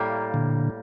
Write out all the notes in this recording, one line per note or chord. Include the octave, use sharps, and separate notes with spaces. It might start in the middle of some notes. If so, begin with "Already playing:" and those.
Already playing: A2 G3 A#3
A#2 D3